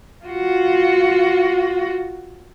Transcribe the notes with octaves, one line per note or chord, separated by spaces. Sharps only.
F4 F#4